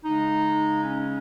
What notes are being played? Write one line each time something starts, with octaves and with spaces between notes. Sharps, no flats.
C#3 G#3 D#4
C#4